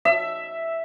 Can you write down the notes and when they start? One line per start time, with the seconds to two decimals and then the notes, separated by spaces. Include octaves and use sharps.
0.05 E5